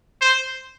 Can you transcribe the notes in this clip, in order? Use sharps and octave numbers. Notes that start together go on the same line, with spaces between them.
C5